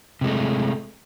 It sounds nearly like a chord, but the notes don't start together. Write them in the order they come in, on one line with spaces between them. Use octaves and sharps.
C3 G#3 A3